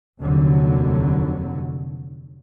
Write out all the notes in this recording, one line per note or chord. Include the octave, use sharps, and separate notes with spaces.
F1 D#2 D3 F#3